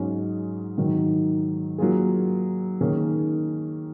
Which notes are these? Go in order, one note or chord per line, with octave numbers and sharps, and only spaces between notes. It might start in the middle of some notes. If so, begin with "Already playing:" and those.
Already playing: G#2 F#3 C#4 G#4
G#2 D#3 F#3
F#3 A#3 F4 G#4
D#3 A#3 C#4 G#4